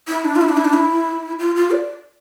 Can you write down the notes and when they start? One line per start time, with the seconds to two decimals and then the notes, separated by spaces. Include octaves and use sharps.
0.08 E4
0.25 D4
0.36 F4
0.41 E4
0.49 D4
0.57 E4
0.65 D4
0.73 E4
1.39 F4
1.56 F4
1.71 D5